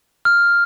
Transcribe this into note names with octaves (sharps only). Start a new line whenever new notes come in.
F6